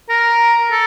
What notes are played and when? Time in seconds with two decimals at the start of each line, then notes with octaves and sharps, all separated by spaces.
0.09 A#4
0.71 A4